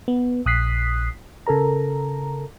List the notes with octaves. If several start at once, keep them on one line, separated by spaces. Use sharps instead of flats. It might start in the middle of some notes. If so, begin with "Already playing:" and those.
B3
A#1 D#6 F#6 B6 C7
C#3 A4 A#4 A#5